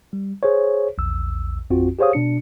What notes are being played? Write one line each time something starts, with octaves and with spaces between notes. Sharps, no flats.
G3
G#4 C5 C#5
A#1 E2 E6
A1 F2 C4 F4 F#4
G4 G#4 C5 C#5 F5 D#6
B2 D4 C#7